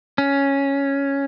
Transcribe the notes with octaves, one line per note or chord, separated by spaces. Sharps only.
C#4